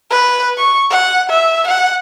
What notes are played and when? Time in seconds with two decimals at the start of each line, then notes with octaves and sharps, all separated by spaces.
0.11 B4
0.58 C#6
0.91 F#5
1.30 E5
1.68 F#5